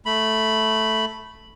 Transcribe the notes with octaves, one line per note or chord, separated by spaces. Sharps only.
A3 B5